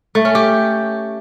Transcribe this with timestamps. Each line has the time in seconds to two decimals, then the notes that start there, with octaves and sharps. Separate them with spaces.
0.15 A3
0.25 C#4
0.35 G4